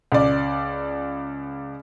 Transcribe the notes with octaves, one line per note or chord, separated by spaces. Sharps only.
C#2 D5